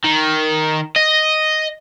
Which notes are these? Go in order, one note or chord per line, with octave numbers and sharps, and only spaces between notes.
D#3
D#5